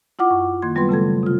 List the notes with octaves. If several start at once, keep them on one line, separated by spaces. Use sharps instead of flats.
E4 F4 F#5 D6
F#2 C#6
D#3 A#3 C6 G#6
F#3 G3 B3 F4 B4 C6
C#3 A3 A4 G#6
C3 F4